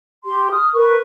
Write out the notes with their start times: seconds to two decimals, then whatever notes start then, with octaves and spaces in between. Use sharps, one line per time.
0.24 G4 C6
0.52 D#6 F6
0.74 A#4 B4 C#6